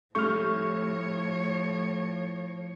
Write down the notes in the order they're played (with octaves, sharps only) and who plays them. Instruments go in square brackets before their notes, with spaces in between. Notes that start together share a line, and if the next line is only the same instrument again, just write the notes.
[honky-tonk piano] C2 A3 G6 [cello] A2 C#5 [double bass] F3 [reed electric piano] C#6 F6